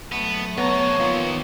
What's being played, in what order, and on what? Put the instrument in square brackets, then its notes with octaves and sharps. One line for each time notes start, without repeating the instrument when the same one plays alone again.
[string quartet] F#3 A3 [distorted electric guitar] B3
[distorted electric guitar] C3 A#5 [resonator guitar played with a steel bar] B3 [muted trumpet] C#5
[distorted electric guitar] D#3 A#3 [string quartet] F3 B3 [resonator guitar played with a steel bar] F4